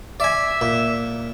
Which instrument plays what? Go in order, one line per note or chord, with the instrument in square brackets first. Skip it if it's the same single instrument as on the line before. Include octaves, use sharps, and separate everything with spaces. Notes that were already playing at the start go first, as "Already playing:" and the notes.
[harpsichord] D5 G#5 [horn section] E5
[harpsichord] A#2